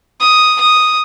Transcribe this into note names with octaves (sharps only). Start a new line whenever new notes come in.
D#6
D#6